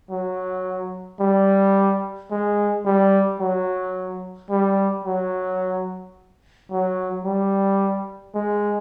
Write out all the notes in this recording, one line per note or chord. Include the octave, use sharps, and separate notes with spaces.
F#3
G3
G#3
G3
F#3
G3
F#3
F#3
G3
G#3